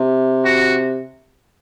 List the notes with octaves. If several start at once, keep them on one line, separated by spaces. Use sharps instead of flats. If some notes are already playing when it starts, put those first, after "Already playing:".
Already playing: C3
F#4